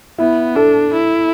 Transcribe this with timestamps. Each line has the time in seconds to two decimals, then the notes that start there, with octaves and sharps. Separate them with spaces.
0.18 B3 E4
0.55 D4 A4
0.93 E4